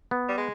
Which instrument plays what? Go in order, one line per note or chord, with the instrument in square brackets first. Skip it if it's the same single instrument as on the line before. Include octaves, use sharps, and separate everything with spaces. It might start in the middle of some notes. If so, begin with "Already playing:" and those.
[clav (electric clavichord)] B3
[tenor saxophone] G3
G#3